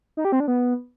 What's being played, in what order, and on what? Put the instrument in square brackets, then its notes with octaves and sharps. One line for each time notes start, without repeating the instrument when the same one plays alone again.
[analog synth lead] D#4
G4
C4
D4
B3